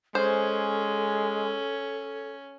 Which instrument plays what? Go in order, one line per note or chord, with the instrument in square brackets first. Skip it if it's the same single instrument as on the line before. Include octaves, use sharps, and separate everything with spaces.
[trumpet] G#3 [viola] C#4 [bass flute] A4 [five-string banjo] C5